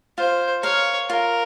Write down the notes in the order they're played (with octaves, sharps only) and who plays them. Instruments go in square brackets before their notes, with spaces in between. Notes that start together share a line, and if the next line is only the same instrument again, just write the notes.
[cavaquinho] F4 [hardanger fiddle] C5
[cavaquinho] A#4 F5 [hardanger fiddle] C#5
[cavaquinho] F4 [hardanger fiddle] A#4